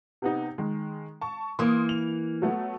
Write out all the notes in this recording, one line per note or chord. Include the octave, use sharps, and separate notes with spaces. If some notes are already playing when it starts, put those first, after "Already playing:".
C3 B3 D#4
D#3 G#3
A5 C#6
E3 A#3 C6 D#6
F7
F#3 A3 B3